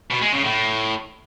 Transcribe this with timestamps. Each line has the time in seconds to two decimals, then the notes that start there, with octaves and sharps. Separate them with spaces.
0.11 B2
0.22 G#3
0.33 C#3
0.44 A2